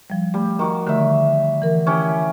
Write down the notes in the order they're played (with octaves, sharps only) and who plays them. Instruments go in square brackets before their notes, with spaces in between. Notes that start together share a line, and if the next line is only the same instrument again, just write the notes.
[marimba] F3 G3
[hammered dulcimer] G3 [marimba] A3
[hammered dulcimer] D#3 F#4
[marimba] D3 D#3 A3 [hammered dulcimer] G3 E5
[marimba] E3 A#4
[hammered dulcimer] C#4 E4 G4